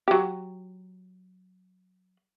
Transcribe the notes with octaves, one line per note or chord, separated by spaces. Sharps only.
F#3 G4